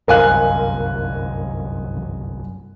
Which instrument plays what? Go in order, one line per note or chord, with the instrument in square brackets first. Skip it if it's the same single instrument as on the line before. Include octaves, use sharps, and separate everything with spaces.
[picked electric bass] G1 C2 F#2 [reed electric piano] A#4 F5 [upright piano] D#5 G#5 F#6